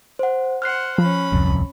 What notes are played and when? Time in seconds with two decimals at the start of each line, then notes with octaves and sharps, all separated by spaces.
0.19 C5 F#5
0.62 C5 F#5 F6 F#6 C7
0.98 F3 C#4 B5
1.32 D1 C2 F2